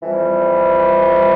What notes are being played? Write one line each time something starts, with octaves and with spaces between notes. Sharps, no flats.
F2 E3 G3